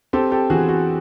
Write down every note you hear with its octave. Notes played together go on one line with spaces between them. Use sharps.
C4 G4 A4
G4 A4
E3 F#4 G#4
F#4